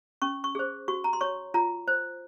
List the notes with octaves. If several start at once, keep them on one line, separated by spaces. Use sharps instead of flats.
C#4 C#6
C#6
G#4 C5
F#4 C#6
A#5
C6
C#5 C#6
F4 A#5
C5